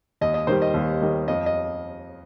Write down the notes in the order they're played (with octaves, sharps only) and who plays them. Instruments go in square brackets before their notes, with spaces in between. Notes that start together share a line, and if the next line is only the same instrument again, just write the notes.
[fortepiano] D#2 D#5
D#5
D#3 G3 C5
D#5
D#2
D#3 G3
F2 D#5
D#5